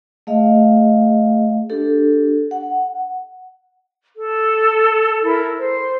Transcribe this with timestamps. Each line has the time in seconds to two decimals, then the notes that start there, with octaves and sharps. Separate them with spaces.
0.27 A3 G#4 D#5 F5
1.70 D4 G4 A4
2.51 F#5
4.16 A4
5.23 E4 A4 A#4
5.59 C5